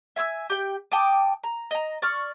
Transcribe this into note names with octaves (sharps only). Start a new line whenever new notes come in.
E5 G#5 C6 E6
G4 G5
G5 A5 D6 D#6
A#5
D#5 A#5
D5 C#6 F6